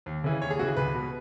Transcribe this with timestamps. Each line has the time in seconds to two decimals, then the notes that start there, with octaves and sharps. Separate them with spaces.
0.06 D#2
0.24 C#3 E3
0.42 D#2 C#5
0.50 G#4
0.59 C#3 E3 F#4
0.68 G#4
0.77 C#2 B4
0.94 B2